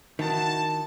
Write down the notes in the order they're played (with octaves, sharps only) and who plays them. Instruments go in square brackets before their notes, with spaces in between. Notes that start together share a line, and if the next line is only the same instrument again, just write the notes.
[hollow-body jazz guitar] D#3 [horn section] E4 F#4 A5